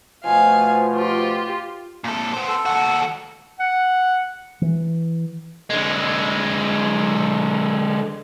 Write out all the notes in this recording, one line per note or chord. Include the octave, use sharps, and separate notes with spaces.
B2 F3 A3 F5 G#5
F4 G4
A#2 A4
B3 C5
A4
D#2 F#4
F#5
E3
D3 G#3